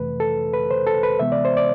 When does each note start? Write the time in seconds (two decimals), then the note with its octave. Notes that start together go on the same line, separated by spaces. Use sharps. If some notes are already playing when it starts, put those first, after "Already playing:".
Already playing: F2 C3 E3 A3 B4
0.20 A4
0.53 B4
0.71 C5
0.87 A4
1.03 B4
1.19 D2 C3 E3 G#3 B3 E5
1.32 D5
1.45 C5
1.57 D5